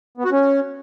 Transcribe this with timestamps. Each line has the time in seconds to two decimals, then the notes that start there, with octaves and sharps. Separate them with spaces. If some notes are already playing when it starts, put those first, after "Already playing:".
0.18 B3
0.25 F#4
0.32 C#4